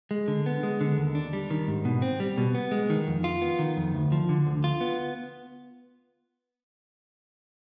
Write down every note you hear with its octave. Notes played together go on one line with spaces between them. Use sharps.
G#3
D3
B3
G#3
D3
D#2
D4
G3
D#3
G#2
B2
C4
G3
B2
B3
G#3
D#3
F2
F4
B3
D#3
F2
D2
F3
D3
D2
F4
B3